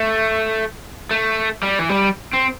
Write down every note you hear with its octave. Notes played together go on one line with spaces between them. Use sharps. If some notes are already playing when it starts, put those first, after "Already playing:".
Already playing: A3
A3
G3
E3
G3
C4